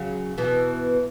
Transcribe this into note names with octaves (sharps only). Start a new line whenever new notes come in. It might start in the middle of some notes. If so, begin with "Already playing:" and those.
Already playing: C#3 F#3
B2 E3